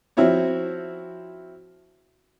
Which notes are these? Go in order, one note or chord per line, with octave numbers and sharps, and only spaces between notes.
F3 C4 E4 F#4 C#5